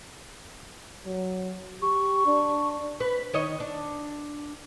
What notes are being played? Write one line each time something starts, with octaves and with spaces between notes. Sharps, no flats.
F#3
G4 C#6
D4
B4
D#3 C#5 D#5
D4